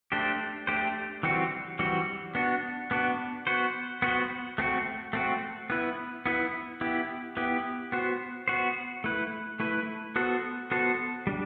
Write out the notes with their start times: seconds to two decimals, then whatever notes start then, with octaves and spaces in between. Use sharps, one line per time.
0.12 A3 D4 G4 C5
0.67 A3 D4 G4 C5
1.23 E3 G3 C4 F#4
1.79 E3 G3 C4 F#4
2.35 B3 D4 F#4
2.91 B3 D4 F#4
3.47 B3 F#4 C5
4.02 B3 F#4 C5
4.58 A3 C4 F#4
5.13 A3 C4 F#4
5.70 B3 E4 B4
6.26 B3 E4 B4
6.81 B3 E4 G4
7.37 B3 E4 G4
7.92 B3 F#4 C5
8.48 B3 F#4 C5
9.04 A3 E4 B4
9.60 A3 E4 B4
10.16 B3 F#4 A4 C5
10.71 B3 F#4 A4 C5
11.27 G3 D4